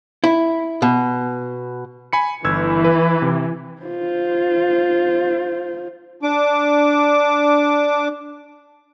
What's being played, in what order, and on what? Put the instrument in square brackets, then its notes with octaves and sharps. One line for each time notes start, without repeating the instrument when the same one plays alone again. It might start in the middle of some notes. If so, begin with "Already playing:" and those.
[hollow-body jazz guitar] E4
B2
[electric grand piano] G#5 B5 C#7
[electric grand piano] G1 E6 G#6 [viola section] E3
[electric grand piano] B4
C3
[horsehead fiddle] F4 C5
[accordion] D4 D6